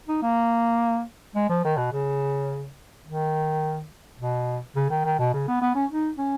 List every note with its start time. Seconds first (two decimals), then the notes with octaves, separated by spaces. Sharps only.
0.08 D#4
0.23 A#3
1.36 G#3
1.50 F3
1.65 D#3
1.78 B2
1.92 C#3
3.06 D#3
4.19 B2
4.76 C#3
4.90 D#3
5.05 D#3
5.19 B2
5.34 C#3
5.48 B3
5.62 B3
5.75 C#4
5.91 D#4
6.18 C#4